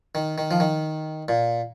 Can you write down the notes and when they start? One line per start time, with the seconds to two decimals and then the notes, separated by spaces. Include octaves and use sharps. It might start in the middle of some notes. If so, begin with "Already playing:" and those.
0.15 D#3
0.38 D#3
0.51 F3
0.60 D#3
1.28 A#2